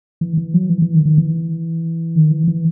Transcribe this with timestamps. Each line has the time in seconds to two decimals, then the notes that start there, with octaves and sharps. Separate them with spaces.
0.21 E3
0.37 E3
0.54 F#3
0.70 E3
0.82 E3
0.94 D#3
1.05 D#3
1.18 E3
2.16 D#3
2.31 E3
2.48 E3